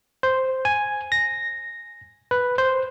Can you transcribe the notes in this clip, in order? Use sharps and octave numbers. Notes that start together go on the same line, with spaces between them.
C5
G#5
A#6
B4
C5